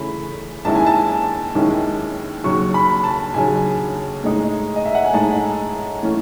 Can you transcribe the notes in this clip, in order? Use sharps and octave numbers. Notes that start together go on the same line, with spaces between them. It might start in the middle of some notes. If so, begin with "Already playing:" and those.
Already playing: C#3 E3 A3 C#4 B5
D#2 D#3 G#3 C#4 E4 A5
G#5
A5
D#2 D#3 G#3 C#4 E4
D#2 C#3 F#3 C#6
B5
A5
D#2 C#3 F#3 G#5
A2 G#3 D#4
D#5
E5
F#5
G#5
A2 G#3 D#4 A5
A2 E3 A3 C#4